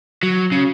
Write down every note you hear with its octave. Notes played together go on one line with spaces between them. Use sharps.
F#3
C#3